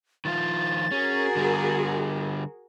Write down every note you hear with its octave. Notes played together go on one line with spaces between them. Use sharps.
D#3 F3 F4 A6
C#4 F#4 G#4 A#4
D3 G3